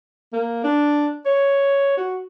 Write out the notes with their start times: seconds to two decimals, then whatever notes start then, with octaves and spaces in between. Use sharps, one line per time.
0.33 A#3
0.64 D4
1.25 C#5
1.97 F#4